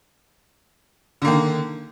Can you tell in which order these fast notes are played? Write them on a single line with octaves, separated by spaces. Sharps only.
D3 A#3 D#3